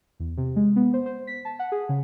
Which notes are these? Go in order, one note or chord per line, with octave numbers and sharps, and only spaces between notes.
E2
C3
G#3
B3
C5
C5
B6
A5
F#5
G#4
C#3